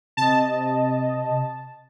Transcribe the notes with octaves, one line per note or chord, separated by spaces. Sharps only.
C3 D#5 A5